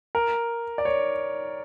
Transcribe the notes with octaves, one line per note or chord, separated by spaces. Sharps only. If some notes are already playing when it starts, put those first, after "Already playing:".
A#4
D5
C#5